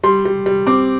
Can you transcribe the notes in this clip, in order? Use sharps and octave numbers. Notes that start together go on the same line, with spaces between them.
G3 C6
G3
G3
C4 D6